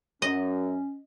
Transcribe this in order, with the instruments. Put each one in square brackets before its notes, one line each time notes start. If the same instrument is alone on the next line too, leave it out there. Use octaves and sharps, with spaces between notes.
[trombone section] F#2 [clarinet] C#4 [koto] D#5